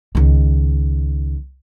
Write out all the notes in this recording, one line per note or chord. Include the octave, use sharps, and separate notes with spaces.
C#2 D#3